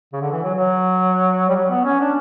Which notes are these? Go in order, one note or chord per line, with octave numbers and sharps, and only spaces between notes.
C#3
D3
E3
F#3
F#3
G3
F#3
B3
C#4
D4